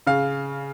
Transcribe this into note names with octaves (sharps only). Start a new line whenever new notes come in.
C#3 F5